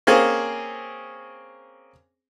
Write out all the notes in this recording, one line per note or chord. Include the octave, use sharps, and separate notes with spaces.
A#3 C4 C#4 G#4